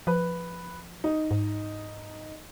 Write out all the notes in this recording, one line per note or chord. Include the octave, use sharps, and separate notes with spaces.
F3 B4
D#4
G#2